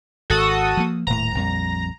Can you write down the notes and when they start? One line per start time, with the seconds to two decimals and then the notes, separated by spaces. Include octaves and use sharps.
0.30 G#1 F#4 A4 D#6
0.77 F3 A#3
1.07 D#1 A2 A#5
1.35 A#1 F2 G3